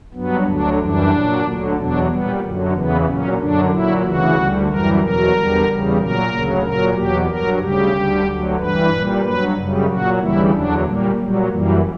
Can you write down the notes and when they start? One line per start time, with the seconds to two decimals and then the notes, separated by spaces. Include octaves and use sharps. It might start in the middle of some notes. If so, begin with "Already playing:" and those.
0.13 G2 F#3 B3
0.46 D2 D3 F#3 D4
0.78 F#2 E3 G3 D4
1.11 A#2 F#3
1.44 D2 D3 F#3
1.76 E2 B2 F#3 D4
2.08 A#2 G3 B3
2.40 F#2 D3 F#3
2.73 E2 C#3 E3 B3
3.05 A#2 F#3 C#4
3.38 F#2 D3 F#3 D4
3.70 A#2 F#3 E4
4.02 D2 C#3 E3 F#4
4.36 D2 D3 G3
4.67 F#2 E3 G3 A#4
5.00 E2 B2 F#3 A#4
5.33 E2 D3 G3
5.65 E2 C#3 G3
5.97 A#2 F#3 A#4
6.29 D2 C#3 F#3
6.62 A#2 F#3 A#4
6.94 E2 B2 F#3 G4
7.27 G2 F#3 A#4
7.59 D2 C#3 G3 G4
7.92 D2 D3 G3
8.24 D2 D3 F#3
8.56 G2 E3 G3 B4
8.90 A#2 G3
9.21 G2 F#3 B4
9.54 F#2 C#3 G3
9.87 A#2 F#3 F#4
10.18 D2 C#3 E3 G3 E4
10.51 E2 D3 F#3 D4
10.84 A#2 G3 A#3
11.15 A#2 F#3 G3
11.48 F#2 E3 G3 A#3